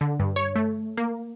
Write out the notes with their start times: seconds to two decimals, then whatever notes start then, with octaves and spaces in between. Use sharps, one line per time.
0.01 D3
0.20 G2
0.36 C#5
0.56 A3
0.97 A#3